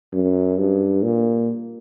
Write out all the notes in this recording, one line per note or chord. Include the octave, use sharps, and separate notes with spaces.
F#2
G2
A#2